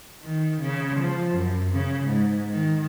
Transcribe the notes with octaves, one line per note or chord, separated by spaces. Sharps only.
D#3
C#3
F3
F#2
C#3
G#2
D#3